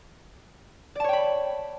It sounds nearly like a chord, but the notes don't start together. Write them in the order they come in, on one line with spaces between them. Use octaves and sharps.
D5 A5 C#5 G5 B5